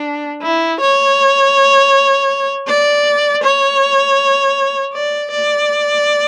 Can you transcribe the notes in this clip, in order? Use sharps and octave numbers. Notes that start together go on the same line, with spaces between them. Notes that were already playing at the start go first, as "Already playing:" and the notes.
Already playing: D4
E4
C#5
D5
C#5
D5
D5